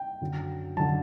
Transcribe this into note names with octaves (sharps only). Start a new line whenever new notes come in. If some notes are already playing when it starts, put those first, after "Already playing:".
Already playing: G5
F#2 D3 F#3
F#2 D3 F#3 A5